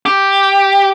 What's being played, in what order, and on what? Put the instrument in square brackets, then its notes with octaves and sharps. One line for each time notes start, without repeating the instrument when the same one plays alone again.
[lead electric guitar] G4